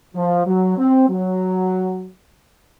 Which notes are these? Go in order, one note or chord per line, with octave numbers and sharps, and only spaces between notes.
F3
F#3
C4
F#3